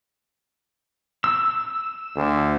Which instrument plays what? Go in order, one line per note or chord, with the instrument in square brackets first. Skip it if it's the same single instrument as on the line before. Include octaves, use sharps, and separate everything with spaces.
[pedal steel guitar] E6
[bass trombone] D2